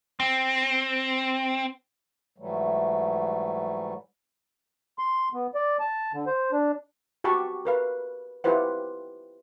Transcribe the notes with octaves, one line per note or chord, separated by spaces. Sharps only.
C4
G#2 E3 F#3 G3 A3
C6
B3
D5
A5
D3
C5
D4
F#4 G4 F#5 A5 B5 C#6
A#4 B4 F5
E4 F4 G4 B4 C5 F#5